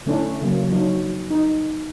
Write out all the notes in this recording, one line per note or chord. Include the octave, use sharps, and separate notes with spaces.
D3 A3 C#4 D4 E4
C#3 F#3 A#3
F3 F#3 D4 D#4
D#4